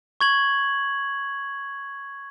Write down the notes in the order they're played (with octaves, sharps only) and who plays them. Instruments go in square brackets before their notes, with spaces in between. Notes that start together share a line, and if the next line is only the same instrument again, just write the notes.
[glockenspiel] C#6 G#6 F#7